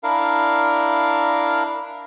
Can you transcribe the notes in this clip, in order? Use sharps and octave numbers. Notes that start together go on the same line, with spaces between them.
D4 E4 A#4 F5